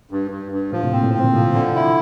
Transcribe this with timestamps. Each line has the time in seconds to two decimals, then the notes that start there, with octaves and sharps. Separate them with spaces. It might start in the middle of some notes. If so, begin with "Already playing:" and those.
0.11 G2
0.31 G2
0.52 G2
0.72 A2 F3
0.83 A2 C3
0.93 A#2 C4
1.03 A2
1.14 C4
1.24 A#2 D3
1.33 A2 C3 F3
1.45 A#2
1.54 A2 D3
1.68 A2 C3
1.76 E4